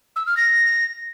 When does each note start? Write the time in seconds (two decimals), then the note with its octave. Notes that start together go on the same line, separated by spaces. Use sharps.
0.16 E6
0.27 F6
0.37 A#6